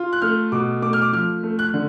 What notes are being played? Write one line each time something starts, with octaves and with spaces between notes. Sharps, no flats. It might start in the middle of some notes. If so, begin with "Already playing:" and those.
Already playing: F4
F#6
A3 F6
B2 D6
A3 D6
F6
D6
F3 F6
A3
F#6
D3